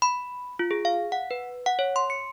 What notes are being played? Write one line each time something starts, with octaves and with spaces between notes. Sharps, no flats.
B5
F4
G#4
F5
F#5
B4
F#5
C#5
C6
C#7